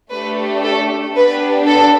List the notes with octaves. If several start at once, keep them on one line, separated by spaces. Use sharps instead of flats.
A3 D4 G4 B4
A4
B3 D4 G4 B4
A4